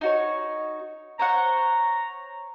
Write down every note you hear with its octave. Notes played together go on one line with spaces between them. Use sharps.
D#4 F#4 C#5
C5 C#5 F#5 A#5